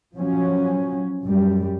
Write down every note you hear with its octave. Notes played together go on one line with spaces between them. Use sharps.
F3 F#3 C#4
F#2 G3